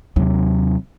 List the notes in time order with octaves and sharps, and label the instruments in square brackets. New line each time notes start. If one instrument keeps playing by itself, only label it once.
[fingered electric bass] D#2 C3 [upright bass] F#3